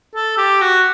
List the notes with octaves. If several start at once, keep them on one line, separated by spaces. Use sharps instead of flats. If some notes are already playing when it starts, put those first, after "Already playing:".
A4
G4
F#4